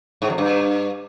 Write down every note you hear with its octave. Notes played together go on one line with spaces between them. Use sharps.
G#2
F2
G2